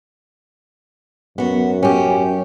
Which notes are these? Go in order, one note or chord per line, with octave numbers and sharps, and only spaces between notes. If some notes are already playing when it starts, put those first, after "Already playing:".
F#2 B3 F#4
C#4 G4